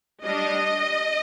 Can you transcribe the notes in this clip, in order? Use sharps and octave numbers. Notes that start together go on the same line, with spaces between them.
G3 D4 D#5